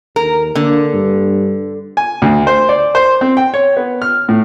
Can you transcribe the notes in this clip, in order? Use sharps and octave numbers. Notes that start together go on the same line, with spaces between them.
D#2 A#4
D3 A#3
G2
G#5
D2
C5
D5
C5
C4
G5
C#5
B3
F6
A2